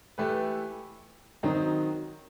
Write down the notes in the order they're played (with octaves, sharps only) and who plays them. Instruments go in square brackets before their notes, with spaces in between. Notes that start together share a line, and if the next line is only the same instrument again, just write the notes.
[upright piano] E3 A3 E4 G4 B4
D#3 F#3 C4 D#4